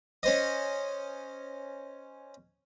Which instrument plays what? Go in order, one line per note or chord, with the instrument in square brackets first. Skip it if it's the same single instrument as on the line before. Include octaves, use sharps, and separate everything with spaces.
[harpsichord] C#4 C5 D#5